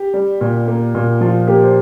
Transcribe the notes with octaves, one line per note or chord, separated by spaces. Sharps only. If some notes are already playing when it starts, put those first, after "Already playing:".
Already playing: G4
G3
A#2
A#3
A#2
F3 F4
A#3 G4
C5